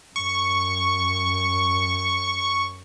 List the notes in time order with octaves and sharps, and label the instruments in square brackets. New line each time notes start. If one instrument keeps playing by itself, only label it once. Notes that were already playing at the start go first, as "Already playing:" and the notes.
[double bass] F#2 [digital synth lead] C#6